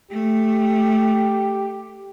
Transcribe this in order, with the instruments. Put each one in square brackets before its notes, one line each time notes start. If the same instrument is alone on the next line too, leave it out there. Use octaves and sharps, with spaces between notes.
[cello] A3 [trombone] G4